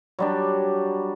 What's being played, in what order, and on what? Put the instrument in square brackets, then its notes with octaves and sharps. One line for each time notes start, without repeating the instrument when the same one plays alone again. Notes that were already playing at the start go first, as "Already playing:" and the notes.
[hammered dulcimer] F#3 G3 D4